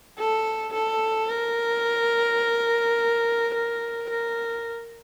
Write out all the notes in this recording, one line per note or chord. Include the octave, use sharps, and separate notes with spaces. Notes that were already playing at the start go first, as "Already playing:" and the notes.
A4
A4
A#4
A#4
A#4